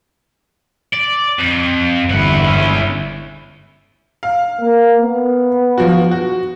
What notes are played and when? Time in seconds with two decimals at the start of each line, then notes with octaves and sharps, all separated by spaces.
0.93 D5
1.39 F2
2.10 G1 E2 E4 F#5
2.45 G#3 C#4
4.23 F5
4.60 A#3
5.01 B3
5.78 F3 F#4
6.11 F#4